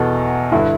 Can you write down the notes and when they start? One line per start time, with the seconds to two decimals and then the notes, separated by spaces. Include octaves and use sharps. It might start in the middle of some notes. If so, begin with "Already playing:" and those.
Already playing: E2 B2 A4
0.52 G2 D3 E4